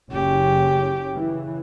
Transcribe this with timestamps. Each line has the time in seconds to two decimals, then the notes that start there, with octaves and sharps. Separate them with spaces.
0.12 F#1 C#3 C#4 G4
1.15 C#3 E3